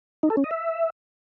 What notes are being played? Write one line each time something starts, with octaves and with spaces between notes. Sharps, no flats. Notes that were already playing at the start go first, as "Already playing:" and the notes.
D#4
A4
C#4
D#5
E5